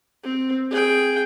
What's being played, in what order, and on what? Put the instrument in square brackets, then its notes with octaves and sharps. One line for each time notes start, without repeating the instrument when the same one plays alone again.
[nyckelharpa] C4
G#4 G5